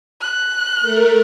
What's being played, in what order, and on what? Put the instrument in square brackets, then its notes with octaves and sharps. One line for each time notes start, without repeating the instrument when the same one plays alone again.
[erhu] F#6
[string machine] A3 A#4